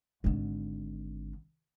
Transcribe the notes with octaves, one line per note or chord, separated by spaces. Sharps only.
G#1 D3